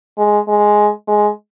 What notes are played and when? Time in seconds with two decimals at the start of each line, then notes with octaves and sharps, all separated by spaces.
0.18 G#3
0.48 G#3
1.08 G#3